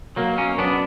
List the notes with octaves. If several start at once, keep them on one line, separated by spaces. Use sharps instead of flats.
B2 F#3 A#3
A#3 C#4
F#3 B3 C#4 D4